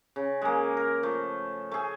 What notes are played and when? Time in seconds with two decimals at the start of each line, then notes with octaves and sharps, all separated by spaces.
0.16 C#3
0.42 G#3 A#3
0.77 A#4
1.03 F3 A3
1.72 A3 G#4